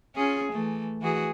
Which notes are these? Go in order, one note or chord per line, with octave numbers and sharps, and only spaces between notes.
C#4 F4 G#4
E3 A3
E3 F#4 G#4